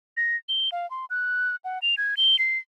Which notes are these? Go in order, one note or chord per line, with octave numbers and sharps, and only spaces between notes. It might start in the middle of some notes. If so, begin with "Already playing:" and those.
A#6
G7
F5
C6
F#6
F#5
F7
G#6
G7
C7